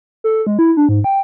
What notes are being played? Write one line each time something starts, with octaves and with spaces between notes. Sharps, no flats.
A4
G#3
E4
D4
G#2
G5